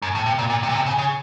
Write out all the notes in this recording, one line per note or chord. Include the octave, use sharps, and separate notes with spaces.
F#2
A2
C3
A#2
A#2
C3
A#2
C3
C#3
C#3